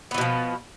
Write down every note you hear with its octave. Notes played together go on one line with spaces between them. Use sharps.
B2 E3 F3 B3